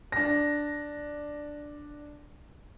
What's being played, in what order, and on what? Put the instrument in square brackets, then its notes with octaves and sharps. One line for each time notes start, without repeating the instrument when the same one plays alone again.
[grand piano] D4 A#6